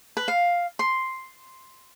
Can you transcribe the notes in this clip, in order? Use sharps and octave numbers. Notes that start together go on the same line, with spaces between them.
B4
F5
C6